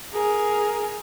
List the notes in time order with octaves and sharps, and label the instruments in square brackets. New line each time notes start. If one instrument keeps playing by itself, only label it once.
[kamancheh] G#4 A#4